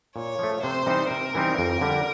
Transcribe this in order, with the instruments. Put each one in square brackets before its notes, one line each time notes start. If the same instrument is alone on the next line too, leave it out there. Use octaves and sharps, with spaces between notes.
[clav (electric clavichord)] A#2 [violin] C#5
[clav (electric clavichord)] F3 A3
[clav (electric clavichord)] C3 [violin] C5
[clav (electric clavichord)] E3 G3 C4 D#4
[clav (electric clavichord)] C3 [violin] A#4
[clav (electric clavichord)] E3 G3 C4 D#4
F2
D3 G3